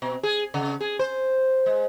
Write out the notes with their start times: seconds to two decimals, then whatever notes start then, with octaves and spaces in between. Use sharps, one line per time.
0.02 B2
0.23 G#4
0.54 C#3
0.81 G#4
0.99 C5
1.66 G#3